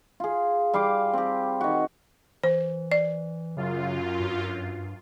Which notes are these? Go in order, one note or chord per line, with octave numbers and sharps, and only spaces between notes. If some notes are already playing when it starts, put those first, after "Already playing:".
F4 G#4
G3 F5 C6 D6
C4 G4
D#3 F#4
E3 C5
D5
F#2 C#3 F4
G2